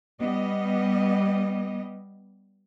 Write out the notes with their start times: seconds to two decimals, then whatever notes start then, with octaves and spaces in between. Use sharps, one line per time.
0.19 G3 B3 D#5